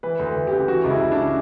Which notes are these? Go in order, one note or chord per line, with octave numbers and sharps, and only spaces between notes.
E3 B4
D2
B4
D2
G4
C#3
E3 F#4
C#2
E4
C#2
D4
C#3